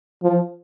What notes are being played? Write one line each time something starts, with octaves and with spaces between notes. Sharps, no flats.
F3